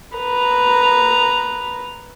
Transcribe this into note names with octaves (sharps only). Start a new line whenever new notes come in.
B4 A#5